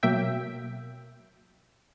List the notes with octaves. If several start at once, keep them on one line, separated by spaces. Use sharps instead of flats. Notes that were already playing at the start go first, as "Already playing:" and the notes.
B2 F#3 A#3 E5 G5